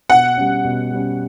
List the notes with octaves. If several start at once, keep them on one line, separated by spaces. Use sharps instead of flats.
B2 F#5
G3 C#4
B2
G3 C#4